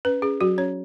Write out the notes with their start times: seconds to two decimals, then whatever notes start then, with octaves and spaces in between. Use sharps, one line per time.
0.05 C#4 B4
0.22 C#4 G#4
0.41 F#3 F#4
0.58 C#4 C#5